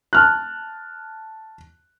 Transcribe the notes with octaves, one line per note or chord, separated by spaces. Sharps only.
A5 F6 F#6